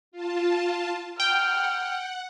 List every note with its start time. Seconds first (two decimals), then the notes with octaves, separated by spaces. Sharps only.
0.12 F4 A5
1.20 F#5 G5 F6